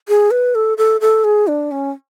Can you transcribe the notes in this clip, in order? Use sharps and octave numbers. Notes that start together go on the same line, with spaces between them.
G#4
B4
A4
A4
A4
G#4
D4
C#4